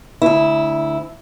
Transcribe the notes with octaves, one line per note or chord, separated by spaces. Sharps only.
D2 E4